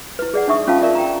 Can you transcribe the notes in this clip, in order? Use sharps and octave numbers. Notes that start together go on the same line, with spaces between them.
E4 B4
G#4 D5 F#5
D4 D#4 E5 C#6 D#6
C#4 F4 B4 F5 A5
F4 A#4 D5 E5
G5 A#5